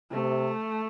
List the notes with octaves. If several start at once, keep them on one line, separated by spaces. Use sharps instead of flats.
C3 A3